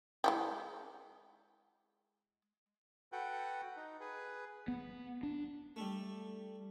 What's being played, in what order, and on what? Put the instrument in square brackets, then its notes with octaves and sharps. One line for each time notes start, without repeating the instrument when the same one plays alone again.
[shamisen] G#3 E4 G4
[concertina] F#4 A4 B4 F#5 G5
D#4
G#4 B4
[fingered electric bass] B3
D4
[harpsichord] G3 A3